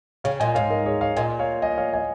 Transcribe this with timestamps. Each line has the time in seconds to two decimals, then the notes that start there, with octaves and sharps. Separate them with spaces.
0.24 C#3 C#5 F5
0.40 A#2 D#5 G#5
0.55 G#2 C#5 F5
0.70 A#4 D#5
0.86 G#4 C#5
1.01 C#5 F5
1.16 A#2 D#5 G#5
1.39 C#5 F5
1.62 D#5 G#5
1.78 C#5 F5
1.93 D#5 G#5